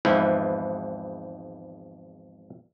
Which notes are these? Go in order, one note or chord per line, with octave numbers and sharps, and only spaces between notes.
G#1 E2 G#2 F3 E4 B4